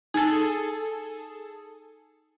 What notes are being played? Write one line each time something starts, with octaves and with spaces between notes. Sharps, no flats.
D#4 G#4 A4